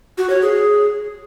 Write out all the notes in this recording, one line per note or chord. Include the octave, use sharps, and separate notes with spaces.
F#4
C#5
G#4